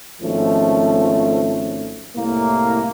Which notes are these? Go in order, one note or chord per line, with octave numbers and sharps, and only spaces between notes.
G#1 F3 A3 C#4
C2 A2 A#3